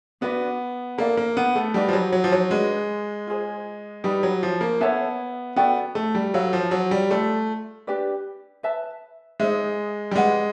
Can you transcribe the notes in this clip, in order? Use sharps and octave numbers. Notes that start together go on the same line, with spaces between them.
B3 D4 F#4 B4 D5
A#3 A4 D5 F5
A#3
B3
A3
G3 D#4 F#4 B4 D5
F3
F#3
F#3
F3
F#3
G#3 D4 F#4 B4
F4 G#4 C5
G3 D#4 G4 B4 D5
F#3
F3
A#3
B3 A4 C#5 E5 A5
B3 F#4 A4 D5 G5
A3
G3
F#3 A4 C5 F5
F3
F#3
G3
A3 F4 A4 D5
D4 G4 B4 D5
B4 E5 A5
G#3 D#4 G#4 C5 E5
G3
G#3 B4 D5 F#5